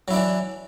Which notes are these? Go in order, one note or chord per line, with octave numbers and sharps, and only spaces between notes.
E3 F#3 D4 E4